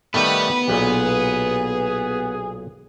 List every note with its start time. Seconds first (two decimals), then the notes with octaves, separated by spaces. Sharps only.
0.14 D#3 G3 A3 B3 B4 B5
0.68 B1 A#2 G#4